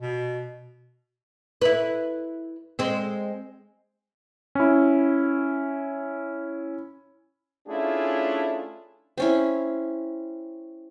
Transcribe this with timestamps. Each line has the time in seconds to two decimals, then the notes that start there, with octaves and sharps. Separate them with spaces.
0.02 B2
1.61 E4 B4
2.79 G#3 C4
4.55 C#4 E4
7.67 A3 C#4 D4 E4 F4 G#4
9.18 C4 C#4 E4